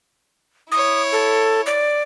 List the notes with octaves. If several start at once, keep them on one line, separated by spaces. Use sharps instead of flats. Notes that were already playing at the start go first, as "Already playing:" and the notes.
E4 C#5 D#6
A4
D5